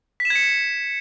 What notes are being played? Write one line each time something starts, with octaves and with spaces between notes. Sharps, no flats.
B6
E7
G#6
C#7